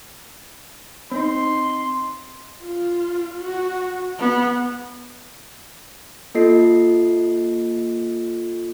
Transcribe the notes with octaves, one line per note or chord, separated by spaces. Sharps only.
C4 D#4 C6
F4
F#4
B3
A#3 F4 A4 D#5 C7